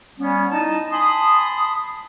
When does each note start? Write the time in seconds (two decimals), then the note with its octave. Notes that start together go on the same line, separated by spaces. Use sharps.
0.18 G3 B3 C#4
0.50 D#4 E4 D#5 A5
0.92 G#5 A5 B5 C6 D#6